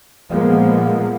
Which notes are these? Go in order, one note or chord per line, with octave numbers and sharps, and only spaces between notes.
A#2 F3 G#3 A#3 B3